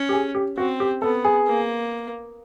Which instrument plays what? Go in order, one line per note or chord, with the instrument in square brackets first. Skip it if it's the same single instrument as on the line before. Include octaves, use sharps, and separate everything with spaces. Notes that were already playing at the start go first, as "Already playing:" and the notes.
Already playing: [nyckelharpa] C#4
[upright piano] G4
G#4
G4
[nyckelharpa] C4 [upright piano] F#4
[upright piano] G4
[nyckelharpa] B3 [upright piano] A4
[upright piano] G#4
[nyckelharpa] A#3